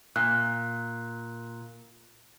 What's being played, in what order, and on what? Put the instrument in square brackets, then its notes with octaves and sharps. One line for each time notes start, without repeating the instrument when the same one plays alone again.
[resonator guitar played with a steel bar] A#2 [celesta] F#6